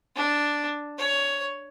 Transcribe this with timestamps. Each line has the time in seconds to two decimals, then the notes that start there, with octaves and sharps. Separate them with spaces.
0.15 D4
0.98 C#5